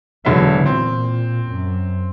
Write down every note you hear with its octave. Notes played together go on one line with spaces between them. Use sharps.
E1 D3 E3 F#3 E5
A#2 C4
F#2